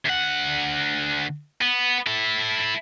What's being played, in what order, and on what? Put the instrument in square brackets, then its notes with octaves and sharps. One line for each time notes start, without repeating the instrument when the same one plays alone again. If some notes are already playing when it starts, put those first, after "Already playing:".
[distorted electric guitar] D2 F#5
B3
E4 A4